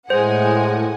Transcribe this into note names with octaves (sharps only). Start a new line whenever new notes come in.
A2 G#3 C5 F#5 G#5